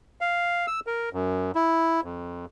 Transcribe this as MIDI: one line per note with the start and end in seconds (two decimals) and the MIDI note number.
0.21 0.66 77
0.67 0.80 88
0.87 1.09 70
1.13 1.51 42
1.55 2.01 64
2.04 2.45 41